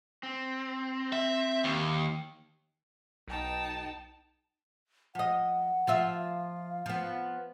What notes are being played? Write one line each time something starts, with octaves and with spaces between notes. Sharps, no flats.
C4
E5
D#2
B1 D#4 G5 A5
F3 D#5 F#5
F3 F4 E5
F5
F3 B3